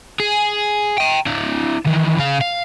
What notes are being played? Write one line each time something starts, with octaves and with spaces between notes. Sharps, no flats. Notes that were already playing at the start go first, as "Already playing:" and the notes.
G#4
G5 A#5
D4 E4
D#3 E3
C#3 F5
F5